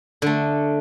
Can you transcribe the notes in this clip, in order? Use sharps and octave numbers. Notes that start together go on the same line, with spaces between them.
D3 A3